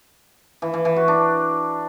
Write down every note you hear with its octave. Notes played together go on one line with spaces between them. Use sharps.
E3
E3
E3
F#4
D4